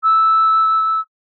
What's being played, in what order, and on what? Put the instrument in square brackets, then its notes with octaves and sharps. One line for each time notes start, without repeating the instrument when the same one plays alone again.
[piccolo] E6